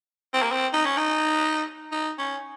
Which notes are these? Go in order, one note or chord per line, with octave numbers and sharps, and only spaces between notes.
C4
A#3
C4
D#4
C#4
D#4
D#4
C#4